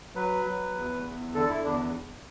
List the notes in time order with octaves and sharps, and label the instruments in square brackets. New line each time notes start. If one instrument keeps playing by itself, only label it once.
[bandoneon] F#3 B4
F#3
E2
E2
D3 A4
E4
E2 D4